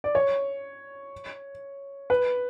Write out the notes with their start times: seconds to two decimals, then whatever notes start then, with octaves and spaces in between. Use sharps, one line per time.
0.04 D5
0.15 C#5
2.10 B4